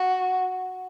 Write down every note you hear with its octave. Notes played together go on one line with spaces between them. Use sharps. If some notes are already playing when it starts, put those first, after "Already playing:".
Already playing: F#4